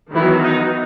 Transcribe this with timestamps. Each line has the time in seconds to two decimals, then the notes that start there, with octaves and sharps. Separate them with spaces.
0.13 D#3 E3 F#3 B3 E4
0.43 D#4